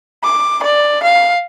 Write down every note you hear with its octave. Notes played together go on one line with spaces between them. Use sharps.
D6
D5
F5